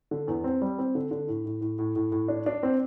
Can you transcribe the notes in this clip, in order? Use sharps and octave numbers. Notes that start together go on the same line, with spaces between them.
D3
E2
C4
G3
C4
D3
D3
A2
A2
A2
A2
A2
A2
D4
D4
C4